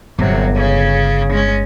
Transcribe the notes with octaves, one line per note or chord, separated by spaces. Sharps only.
G1 C3 F#3
C#3 C#4
G#3 C#4